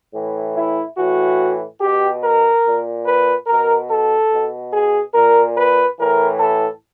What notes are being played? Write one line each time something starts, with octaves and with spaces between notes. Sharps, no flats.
A2 E3
E4
A2 E3 F#4
B2 G4
A#4
A#2
B4
B2 A#4
A4
B2
G#4
A#2 A#4
B4
A2 E3 A#4
A4